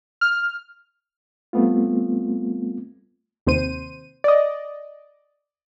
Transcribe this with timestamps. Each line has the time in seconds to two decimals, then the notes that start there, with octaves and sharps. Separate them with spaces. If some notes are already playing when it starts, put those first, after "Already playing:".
0.21 F6
1.53 G3 A3 B3 C4 F4
3.47 D#2 C3 C5 D#7
4.24 D5 D#5